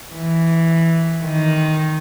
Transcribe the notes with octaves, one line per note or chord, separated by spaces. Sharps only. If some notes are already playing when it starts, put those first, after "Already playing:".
E3
D#3